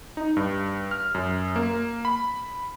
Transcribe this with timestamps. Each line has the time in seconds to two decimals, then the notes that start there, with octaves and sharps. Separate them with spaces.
0.17 D#4
0.37 G2
0.91 F6
1.14 F#2
1.56 A#3
2.05 B5